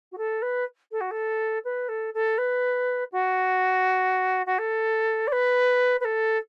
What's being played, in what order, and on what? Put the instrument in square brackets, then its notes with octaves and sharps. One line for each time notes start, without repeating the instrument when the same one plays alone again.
[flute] F#4
A4
B4
A4
F#4
A4
B4
A4
A4
B4
F#4
F#4
A4
D5
B4
B4
A4